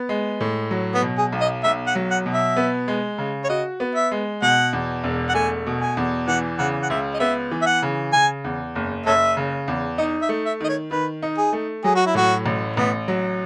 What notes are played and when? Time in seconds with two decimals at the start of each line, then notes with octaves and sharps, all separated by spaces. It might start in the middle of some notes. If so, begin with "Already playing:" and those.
Already playing: B3
0.09 G#3
0.41 A2
0.71 F#3
0.94 B3
1.02 B2
1.18 G#4
1.32 B1
1.41 D#5
1.64 B1 E5
1.87 F#5
1.95 F#3
2.11 F#5
2.26 B2
2.34 E5
2.57 B3
2.88 G#3
3.18 C#3
3.44 C#5
3.49 F#4 D#5
3.80 B3
3.95 E5
4.11 G#3
4.42 B2 F#5
4.73 E2
5.04 E1
5.29 F#5
5.34 A3 G#5
5.66 B2
5.81 G#5
5.97 E2
6.27 E3 F#5
6.58 C#3 F#5
6.83 F#5
6.90 C#2 E5
7.14 D#5
7.20 B3 E5
7.51 E3
7.62 E5
7.66 F#5
7.82 C#3
8.13 C#3 G#5
8.44 E2
8.75 F#1
9.06 F#1 A4 C#5 E5
9.37 C#3
9.68 E2
9.98 D#4 D#5
10.22 E5
10.29 A3
10.45 E5
10.60 D#3 D#5
10.69 C#5
10.91 D#3 B4
11.22 D#4
11.38 G#4
11.53 A3
11.84 F#3 G#4
11.95 F#4
12.06 E4
12.15 A2 F#4
12.46 A1
12.76 A1 B3
13.08 F#3